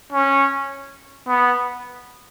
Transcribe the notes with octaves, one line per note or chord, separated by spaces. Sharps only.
C#4
B3